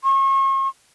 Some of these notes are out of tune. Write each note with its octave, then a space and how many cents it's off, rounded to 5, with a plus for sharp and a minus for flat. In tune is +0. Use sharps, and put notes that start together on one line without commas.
C#6 -40